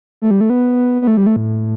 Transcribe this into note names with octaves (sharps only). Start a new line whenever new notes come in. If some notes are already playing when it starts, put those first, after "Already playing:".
A3
G3
A3
B3
B3
A3
G3
A3
A2